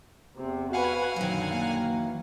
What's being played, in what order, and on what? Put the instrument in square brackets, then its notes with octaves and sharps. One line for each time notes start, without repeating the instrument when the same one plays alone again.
[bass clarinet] E2 [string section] C3
[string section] F#4 B4 [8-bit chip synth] F5 F#5 G#5
[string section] F#2 A#2 D3 [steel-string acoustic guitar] D#3 F#3
[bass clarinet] A#3
[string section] E3